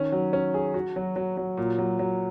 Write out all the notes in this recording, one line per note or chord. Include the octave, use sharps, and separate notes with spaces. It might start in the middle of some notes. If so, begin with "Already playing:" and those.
Already playing: D#3 C#4
F#3
C#4
G#4
F#4
F#3
F#3
F#3
A#2
F#3
F#3